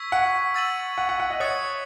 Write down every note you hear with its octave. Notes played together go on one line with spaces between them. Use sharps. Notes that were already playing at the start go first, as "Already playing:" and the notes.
Already playing: C#6 E6 G#6 B6
F#5
E6 A6 D#7 F#7
F#5
F#5
F#5
D#5
C#5 D#6 F#6 A6 C#7